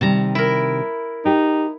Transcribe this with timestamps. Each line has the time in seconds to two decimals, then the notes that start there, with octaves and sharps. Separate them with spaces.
0.01 C3 D#3 G3 A5 A#5
0.35 E4 A#4
1.25 D#4 G4 G5